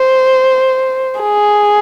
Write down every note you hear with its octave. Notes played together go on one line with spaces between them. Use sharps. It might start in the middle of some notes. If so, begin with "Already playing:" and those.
Already playing: C5
G#4